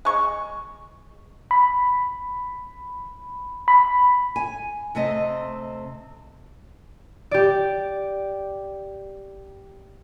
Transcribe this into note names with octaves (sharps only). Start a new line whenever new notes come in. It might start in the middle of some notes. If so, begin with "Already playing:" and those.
G#3 C#6
B5
B5
G#5
C3 A3 C4 D#5
G4 D5